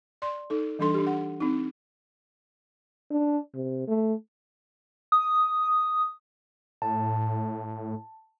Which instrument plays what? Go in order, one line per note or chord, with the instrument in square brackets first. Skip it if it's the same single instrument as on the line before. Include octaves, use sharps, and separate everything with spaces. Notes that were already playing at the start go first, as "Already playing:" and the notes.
[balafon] D5 C6
D#4 A4
E3 G3 D4 A4 C6
D4 G4
F#5
C4 D#4
[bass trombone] D4
C3
A3
[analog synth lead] D#6
[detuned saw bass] A2 [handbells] A5